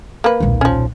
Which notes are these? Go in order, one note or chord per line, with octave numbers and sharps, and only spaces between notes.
A#3 B4
D#1 B1
F3 C#4